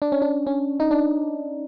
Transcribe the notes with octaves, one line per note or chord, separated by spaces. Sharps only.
D4
C#4
D4
C#4
D#4
D4